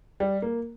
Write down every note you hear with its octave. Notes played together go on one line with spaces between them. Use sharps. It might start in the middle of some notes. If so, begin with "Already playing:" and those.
G3
A#3